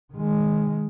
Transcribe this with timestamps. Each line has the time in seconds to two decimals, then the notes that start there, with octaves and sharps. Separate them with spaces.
0.13 D#3 G#3